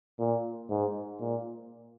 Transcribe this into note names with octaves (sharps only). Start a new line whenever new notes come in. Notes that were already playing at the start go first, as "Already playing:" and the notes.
A#2
G#2
A#2